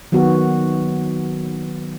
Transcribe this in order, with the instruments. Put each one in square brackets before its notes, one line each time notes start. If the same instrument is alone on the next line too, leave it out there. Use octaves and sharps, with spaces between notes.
[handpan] D#3 F#3 B3 F#4